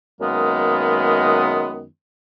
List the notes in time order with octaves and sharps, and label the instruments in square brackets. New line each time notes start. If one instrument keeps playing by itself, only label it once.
[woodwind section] F#2 D#3 G#3 A#3 B3